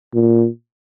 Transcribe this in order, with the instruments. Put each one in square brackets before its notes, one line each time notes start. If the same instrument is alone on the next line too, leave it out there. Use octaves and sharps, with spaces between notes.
[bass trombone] A#2